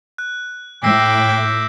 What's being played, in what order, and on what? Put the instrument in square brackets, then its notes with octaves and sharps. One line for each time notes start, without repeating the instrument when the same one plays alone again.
[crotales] F#6
[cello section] A2 [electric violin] E5 D6 [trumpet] G5 [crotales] E6 A#6 C7
[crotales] G6